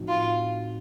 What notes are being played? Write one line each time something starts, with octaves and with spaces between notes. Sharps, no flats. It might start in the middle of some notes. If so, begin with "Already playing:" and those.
Already playing: A2 F3 C4 D#4 F#4
F4